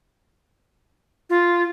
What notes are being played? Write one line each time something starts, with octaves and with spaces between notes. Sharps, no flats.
F4